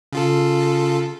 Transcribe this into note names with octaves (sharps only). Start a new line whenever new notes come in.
C#3 F4 A4